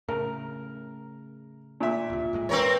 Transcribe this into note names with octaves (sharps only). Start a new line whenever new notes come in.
A2 C#3 A#4
A#2 E5
D1 C3 F4
E1 A2 G#3
C4 A#4 B4 C#5 G5